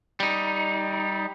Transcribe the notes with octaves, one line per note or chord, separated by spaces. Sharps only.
G3 D#4